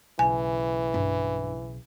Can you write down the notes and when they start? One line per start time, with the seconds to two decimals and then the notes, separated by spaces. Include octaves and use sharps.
0.19 B1 C#3 E3 G#5
0.94 G2 E4